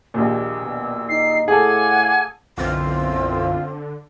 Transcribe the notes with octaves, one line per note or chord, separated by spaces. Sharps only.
A#1 D#2 A#2 E6
B2
D#4 C7
A2 G#4 A4 F5 F#5 G#5 D6
B1 F#2 D3 E3 C4 F4